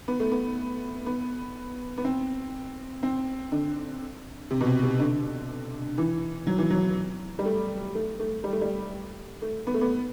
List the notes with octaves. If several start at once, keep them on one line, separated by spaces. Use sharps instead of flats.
B3
A3
B3
B3
B3
C4
C4
D3
C3
B2
C3
C3
D3
E3
F#3
E3
F#3
G3
A3
A3
A3
G3
A3
G3
A3
B3
A3
B3